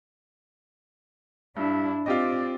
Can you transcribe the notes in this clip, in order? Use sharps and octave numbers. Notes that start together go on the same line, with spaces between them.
G2 D4 E4
C4 F4 G4 D5 D#5